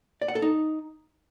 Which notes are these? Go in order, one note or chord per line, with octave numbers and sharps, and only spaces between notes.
D5
F#5
A4
D#4